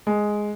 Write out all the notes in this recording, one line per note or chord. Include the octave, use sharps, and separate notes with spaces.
G#3